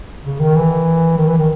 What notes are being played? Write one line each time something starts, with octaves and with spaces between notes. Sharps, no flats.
C#3
D#3
E3
D#3
E3
D#3